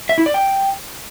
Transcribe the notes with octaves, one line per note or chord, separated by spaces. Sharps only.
E5
E4
D5
G5